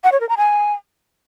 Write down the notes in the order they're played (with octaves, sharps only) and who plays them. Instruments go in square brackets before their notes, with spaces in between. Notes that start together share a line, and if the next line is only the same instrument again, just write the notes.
[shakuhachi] F#5
C#5
A#4
A#5
G#5